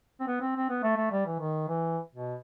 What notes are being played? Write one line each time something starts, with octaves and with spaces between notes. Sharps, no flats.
C4
B3
C4
C4
B3
A3
A3
G3
E3
D#3
E3
B2